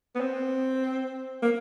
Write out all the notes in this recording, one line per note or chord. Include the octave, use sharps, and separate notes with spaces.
B3
C4
A#3